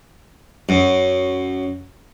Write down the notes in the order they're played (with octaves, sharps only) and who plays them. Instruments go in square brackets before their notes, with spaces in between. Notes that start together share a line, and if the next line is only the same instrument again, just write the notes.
[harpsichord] F#2